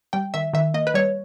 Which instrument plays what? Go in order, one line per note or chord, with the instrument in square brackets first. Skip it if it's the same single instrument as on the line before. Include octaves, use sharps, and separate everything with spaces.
[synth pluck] G3 G5
D#3 E5
D#3 E5
A#3 D#5
B4
G3 C#5